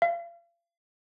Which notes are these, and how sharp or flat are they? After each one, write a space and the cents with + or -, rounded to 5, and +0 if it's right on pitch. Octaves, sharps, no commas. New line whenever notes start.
F5 -35